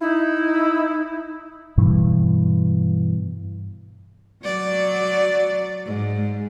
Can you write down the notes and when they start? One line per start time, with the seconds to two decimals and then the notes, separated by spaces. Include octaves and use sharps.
0.01 D#4 E4
1.78 G2 B2 E3
4.43 F#3 D5
5.85 G#2